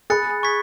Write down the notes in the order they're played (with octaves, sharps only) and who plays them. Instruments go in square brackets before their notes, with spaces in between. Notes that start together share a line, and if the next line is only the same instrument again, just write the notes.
[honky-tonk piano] G#4 [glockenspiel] B5 F#6 A6 C#7
[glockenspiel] C#6 G#6 B6